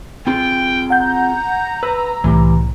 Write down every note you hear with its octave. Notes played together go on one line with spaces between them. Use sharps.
C4 F4 G#4 G5
F#5 A#5 G6
B4 E6
C2 A2 E3 G4